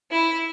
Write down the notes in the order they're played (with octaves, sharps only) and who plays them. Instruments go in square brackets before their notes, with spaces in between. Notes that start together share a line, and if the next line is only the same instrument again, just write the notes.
[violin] E4